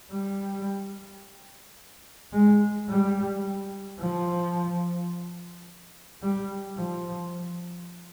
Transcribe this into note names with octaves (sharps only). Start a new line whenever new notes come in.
G3
G#3
G3
F3
G3
F3